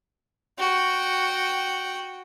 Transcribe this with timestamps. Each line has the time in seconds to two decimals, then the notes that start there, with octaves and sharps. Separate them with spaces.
0.59 F#4 G5